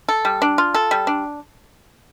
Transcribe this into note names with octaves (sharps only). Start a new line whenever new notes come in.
A4
G3
D4
F4
A4
G3
D4